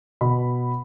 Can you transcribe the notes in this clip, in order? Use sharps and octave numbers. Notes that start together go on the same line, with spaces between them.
B2 B5